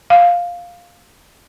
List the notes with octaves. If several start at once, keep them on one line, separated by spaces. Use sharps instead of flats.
F5